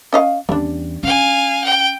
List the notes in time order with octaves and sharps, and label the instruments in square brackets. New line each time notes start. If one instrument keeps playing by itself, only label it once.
[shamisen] C#4 D#5 F5
[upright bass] E2 C#4 [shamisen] G3 D4
[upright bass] C#4 [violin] F5 G#5
[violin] G5